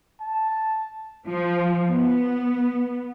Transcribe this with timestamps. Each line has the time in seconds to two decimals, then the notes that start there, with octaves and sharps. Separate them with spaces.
0.21 A5
1.27 F3
1.88 B3